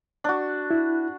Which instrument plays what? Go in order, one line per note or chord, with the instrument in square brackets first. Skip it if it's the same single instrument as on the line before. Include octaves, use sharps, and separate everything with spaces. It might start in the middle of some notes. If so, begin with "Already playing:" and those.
[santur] D4 F#4
[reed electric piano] E4